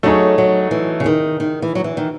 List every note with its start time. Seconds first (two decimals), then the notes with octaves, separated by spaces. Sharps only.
0.03 F#3 A3 D#4 G#4 C#5
0.38 F#3
0.71 E3
1.00 C#3
1.06 D#3
1.40 D#3
1.62 E3
1.75 F#3
1.84 E3
1.97 D#3